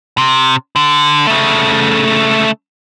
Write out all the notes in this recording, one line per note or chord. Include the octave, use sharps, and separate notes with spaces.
C3
D3
C#3 A3